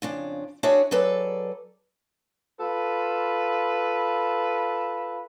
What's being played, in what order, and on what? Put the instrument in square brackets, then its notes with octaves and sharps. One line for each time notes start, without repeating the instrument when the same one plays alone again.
[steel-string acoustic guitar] F2 C#3 D4
D4 F#4 G#4 C5 C#5 E5
F#3 G#4 A4 B4 D5
[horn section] F4 A4 B4